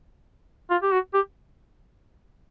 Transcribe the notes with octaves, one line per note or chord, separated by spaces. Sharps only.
F4
G4
F#4
G4